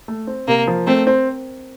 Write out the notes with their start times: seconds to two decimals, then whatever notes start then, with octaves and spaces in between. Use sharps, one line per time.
0.08 A3
0.27 C4
0.48 C3 A#3
0.67 F3
0.87 A3 C4
1.07 C4